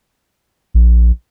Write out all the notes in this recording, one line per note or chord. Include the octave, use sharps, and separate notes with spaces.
A#1